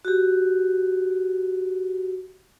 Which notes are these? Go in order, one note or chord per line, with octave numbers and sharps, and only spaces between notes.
F#4 G4